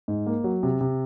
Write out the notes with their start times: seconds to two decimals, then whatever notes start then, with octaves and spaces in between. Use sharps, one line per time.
0.08 G#2
0.26 A#3
0.44 F#3
0.63 C3
0.81 C3